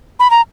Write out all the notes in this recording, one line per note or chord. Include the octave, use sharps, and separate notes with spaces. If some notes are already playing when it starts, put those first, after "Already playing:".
B5
A#5